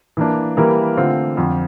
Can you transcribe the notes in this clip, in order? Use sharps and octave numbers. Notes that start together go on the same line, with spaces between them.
E3 A#3 D4
E3 G3 A#3 E4 A#4
D3 A3 C4 F4
F2 D3 F3